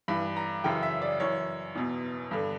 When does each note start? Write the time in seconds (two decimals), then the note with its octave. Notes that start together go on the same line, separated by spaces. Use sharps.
0.08 G2 E3 B5
0.37 A#5
0.64 F#2 C#3 E3 G5
0.83 E5
1.02 D5
1.20 F#2 E3 C#5
1.75 E2 B2
2.31 G2 D3